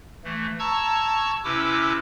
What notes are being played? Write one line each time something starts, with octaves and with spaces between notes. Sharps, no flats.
E3 A3
A5 A#5 C#6 E6 G#6
C3 C#4 E4 B4 D6 E6